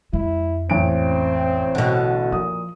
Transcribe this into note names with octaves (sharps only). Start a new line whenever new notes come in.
F2 G#3 E4
A1 C4 C#4 D7
B2 D3
A#2 F3 D#6